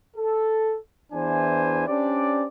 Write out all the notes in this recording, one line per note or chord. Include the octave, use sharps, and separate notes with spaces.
A4
E2 E3 D4 C5 G#5
C#4 D4 G4 C5 D5